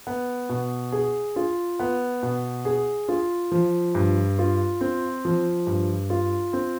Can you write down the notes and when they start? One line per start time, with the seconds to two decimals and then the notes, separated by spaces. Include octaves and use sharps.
0.07 B3
0.49 B2
0.92 G#4
1.36 F4
1.79 B3
2.23 B2
2.65 G#4
3.08 F4
3.52 F3
3.95 G2
4.39 F4
4.81 C4
5.25 F3
5.67 G2
6.10 F4
6.53 C4